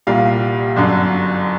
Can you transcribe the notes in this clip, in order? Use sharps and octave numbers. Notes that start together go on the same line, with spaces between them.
C2 A#2 G3 F5
G1 F#2 D3